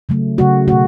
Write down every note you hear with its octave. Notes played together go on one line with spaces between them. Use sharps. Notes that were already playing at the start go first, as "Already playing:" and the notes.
C#3 F#3 A3
C#3 F#3 A3 F#4
B2 F#3 A3 F#4